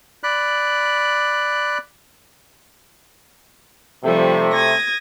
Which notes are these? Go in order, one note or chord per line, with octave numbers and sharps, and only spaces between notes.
D5 B5 F#6
C3 F3 G3 A3
D#6 G#6 A#6